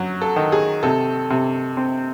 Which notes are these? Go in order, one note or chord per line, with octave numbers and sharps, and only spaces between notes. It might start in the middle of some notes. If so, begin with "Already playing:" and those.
Already playing: F#2 F#3
A4
D#3
G#4
C3 A4
C3
C4